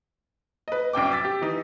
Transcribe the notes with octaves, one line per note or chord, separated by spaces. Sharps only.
B4 D#5
C2 F#2 G5 D6
D6 E6 A6 B6
G4
E3 D#4